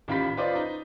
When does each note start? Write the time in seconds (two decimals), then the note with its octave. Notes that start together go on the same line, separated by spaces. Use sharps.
0.08 A1 D#3 F4 G4 B5 B6
0.37 F4 B4 C5 D5 D#5
0.55 D#4